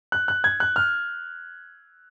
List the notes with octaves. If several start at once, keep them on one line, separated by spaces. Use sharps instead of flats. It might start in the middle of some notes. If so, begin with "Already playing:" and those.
F#6
F#6
G#6
F#6
F6